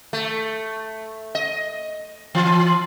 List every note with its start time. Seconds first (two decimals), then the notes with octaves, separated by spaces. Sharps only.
0.13 A3
1.35 D#5
2.35 E3